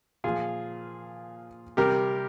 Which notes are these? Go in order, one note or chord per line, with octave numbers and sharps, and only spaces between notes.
A#2 F3 F4 G#4
C3 G3 G4 A#4